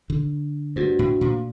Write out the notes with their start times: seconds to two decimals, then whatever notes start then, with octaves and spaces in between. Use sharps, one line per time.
0.10 D3
0.76 G2 A3 D4 F#4 C5
0.99 A2
1.21 A#2